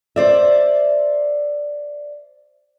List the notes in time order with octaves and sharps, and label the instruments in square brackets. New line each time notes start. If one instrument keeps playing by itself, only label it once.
[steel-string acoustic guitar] C5 D5 E5